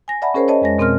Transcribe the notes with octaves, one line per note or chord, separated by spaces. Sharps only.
G#5 A#6
D5 E5 F#5 A5 B5
C#4 G#4 A#4 C5 C#5
C#5 D#5 A5
F2 G#3 A#6
B2 C4 A#4 C6 F6